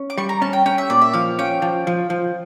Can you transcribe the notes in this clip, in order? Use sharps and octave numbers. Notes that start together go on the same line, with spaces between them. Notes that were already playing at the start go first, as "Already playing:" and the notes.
Already playing: C#4
D6
G3 C#6
A#5
C#4 A5
G5
C#4 G5
E5
A#2 D5
E5
F3 F5
C#4 G5
F3
F3
F3